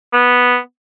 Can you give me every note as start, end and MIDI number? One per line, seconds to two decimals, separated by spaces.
0.13 0.57 59